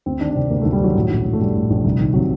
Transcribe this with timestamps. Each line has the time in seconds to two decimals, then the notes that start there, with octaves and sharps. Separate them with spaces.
0.06 D2 C4
0.20 D#3 D4
0.30 D4
0.35 C3 C4
0.50 D2 A#3
0.61 D2 A3
0.73 G3
0.81 D#3 F#3
0.95 A2
1.10 A#1
1.26 A2
1.33 A3
1.40 A#1 G3
1.55 A2
1.70 A#1
1.85 C2
1.99 D#3
2.14 C3 F#3